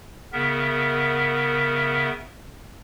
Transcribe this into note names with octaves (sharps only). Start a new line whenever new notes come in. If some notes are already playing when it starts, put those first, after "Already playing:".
C#3 B3 A#4 E5